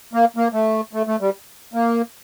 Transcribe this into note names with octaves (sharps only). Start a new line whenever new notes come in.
A#3
A#3
A3
A3
A3
G3
A#3